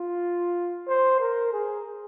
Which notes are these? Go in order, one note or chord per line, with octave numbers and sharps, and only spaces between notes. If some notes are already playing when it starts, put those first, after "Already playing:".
Already playing: F4
C5
A#4
G#4